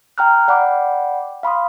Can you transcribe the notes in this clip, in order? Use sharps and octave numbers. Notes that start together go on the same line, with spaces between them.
G5 A#5 F6 F#6
D5 F#5 G5 B5 D6
F5 B5 C6 D#6